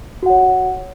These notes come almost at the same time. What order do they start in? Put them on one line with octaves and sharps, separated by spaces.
F#4 F#5 C#5